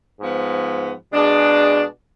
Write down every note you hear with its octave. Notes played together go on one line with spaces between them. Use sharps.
G#2 F3 B3
B2 G#3 D4 G#4